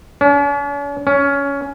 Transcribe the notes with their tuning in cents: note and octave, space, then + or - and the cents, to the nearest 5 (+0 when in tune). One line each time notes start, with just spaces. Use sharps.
C#4 +45
C#4 +15